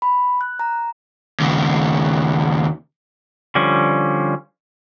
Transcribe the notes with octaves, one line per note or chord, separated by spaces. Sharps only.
B5
F#6
A#5
D#2 C#3
D3 F3 G3 C#4